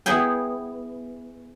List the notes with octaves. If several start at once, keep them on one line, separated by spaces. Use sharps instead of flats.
B3 E4 G#4 G5